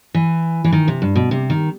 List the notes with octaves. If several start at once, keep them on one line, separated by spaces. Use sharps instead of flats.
E3
E3
D#3
C3
G2
B2
C3
D#3